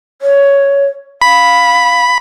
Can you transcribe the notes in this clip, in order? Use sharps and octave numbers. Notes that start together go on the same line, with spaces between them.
C#5
F5 B5